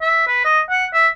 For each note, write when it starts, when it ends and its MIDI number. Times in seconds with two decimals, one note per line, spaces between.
0.02 0.26 76
0.27 0.45 71
0.45 0.60 75
0.70 0.86 78
0.94 1.08 76